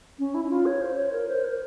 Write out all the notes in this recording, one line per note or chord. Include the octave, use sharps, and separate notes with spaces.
C#4
E4
E4
F4
C#5
C5
C#5
A#4
C5
A#4